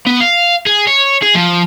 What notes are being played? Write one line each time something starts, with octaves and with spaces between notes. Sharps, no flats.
B3
F5
G#4
C#5
G#4
F3